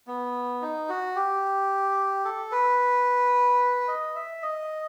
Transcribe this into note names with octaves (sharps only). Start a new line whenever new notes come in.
B3
D#4
F#4
G4
A4
B4
D#5
E5
D#5